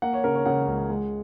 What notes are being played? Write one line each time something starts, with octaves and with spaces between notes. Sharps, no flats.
A#3 F#5
C#5
C#3 A#4
C#5
C#3 F#5
C#2
G#3